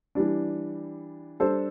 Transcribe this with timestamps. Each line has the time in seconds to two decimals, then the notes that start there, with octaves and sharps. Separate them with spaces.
0.15 E3 G3 D4
1.40 G3 D4 A4 C5